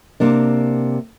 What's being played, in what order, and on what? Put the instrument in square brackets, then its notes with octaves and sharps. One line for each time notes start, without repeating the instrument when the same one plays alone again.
[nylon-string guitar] C3 A#3 D4